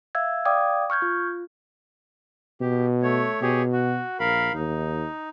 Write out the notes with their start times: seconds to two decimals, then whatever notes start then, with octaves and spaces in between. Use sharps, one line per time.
0.15 E5 F5 E6 G#6
0.45 D5 F5 G5 D6 D#6 G#6
0.90 C#6 F6 G6 G#6
1.02 F4
2.61 B2 G4
3.03 A3 C#5
3.42 B2 G4 G#4 C#5
3.73 F#4
4.20 A#1 A#4 F5 B5
4.54 D#2 D#4